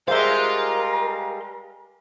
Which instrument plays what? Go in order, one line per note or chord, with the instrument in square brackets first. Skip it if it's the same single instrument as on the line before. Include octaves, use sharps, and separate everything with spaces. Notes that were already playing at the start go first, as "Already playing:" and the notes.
[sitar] G3 G#3 [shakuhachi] A#4 [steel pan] C5 E5 [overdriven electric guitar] F5 C6